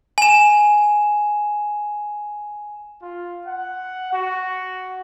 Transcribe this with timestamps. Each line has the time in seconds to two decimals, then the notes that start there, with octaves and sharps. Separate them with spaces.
0.18 G#5 E7
3.02 F4
3.46 F#5
4.12 F#4